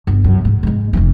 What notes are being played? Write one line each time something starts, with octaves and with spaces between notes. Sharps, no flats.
G1
F#2
G#2
G#2 G#3
F1 E3